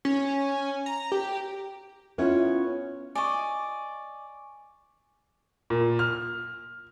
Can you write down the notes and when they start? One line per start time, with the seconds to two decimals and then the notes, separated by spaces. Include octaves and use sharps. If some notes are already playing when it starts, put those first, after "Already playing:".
0.05 C#4
0.86 A#5
1.12 G4
2.18 B3 C#4 E4 F4
3.15 D5 D#5 G#5 C#6
5.70 A#2
5.99 F6